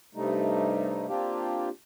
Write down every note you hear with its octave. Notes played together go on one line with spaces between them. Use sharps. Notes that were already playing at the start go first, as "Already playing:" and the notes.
G2 C3 G3 A3 D#4
A#3 C4 D4 F4 G4